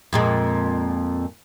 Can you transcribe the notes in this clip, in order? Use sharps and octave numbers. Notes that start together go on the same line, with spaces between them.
F2 A#2 G#3